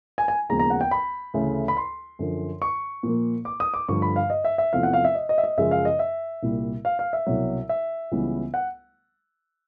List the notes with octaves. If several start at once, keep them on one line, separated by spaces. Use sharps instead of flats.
G#5
G#5
D#2 C#3 F3 G#3 B3 A#5
A#5
F#5
G5
B5
D2 C#3 E3 A3
B5
C6
F#2 D3 F3
C#6
A#2 F3 A#3
D6
D#6
D6
G2 D3 F3 A3 C#6
B5
F5
D#5
E5
E5
E2 C3 F3 A3 F5
F#5
F5
E5
D#5
D#5
E5
D#5
F#2 C#3 F3 G#3 E5
F5
D#5
E5
C2 A#2 G3
F5
F5
E5
C2 B2 F#3
E5
C#2 C#3 E3 G3 B3
F#5